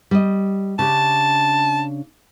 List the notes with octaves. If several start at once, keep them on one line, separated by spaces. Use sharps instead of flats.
G3 D#5
C#3 D4 G4 A5